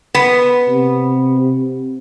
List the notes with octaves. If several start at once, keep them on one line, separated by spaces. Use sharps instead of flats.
B3
C3